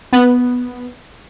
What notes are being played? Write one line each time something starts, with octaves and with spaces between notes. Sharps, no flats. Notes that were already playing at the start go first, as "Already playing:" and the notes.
B3